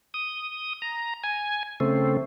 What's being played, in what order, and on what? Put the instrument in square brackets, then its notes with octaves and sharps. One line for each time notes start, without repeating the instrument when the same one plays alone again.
[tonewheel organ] D#6
A#5
G#5
C#3 A3 C4